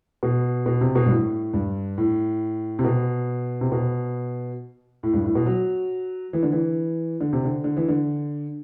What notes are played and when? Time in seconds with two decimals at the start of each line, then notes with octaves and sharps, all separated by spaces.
0.23 B2
0.66 B2
0.81 C3
0.95 B2
1.06 G2
1.10 A2
1.53 G2
1.98 A2
2.79 C3
2.84 B2
3.61 C3
3.72 B2
5.03 A2
5.13 G2
5.24 A2
5.35 B2
5.46 F#3
6.33 E3
6.43 D3
6.52 E3
7.21 D3
7.33 C3
7.44 D3
7.64 D3
7.77 E3
7.89 D3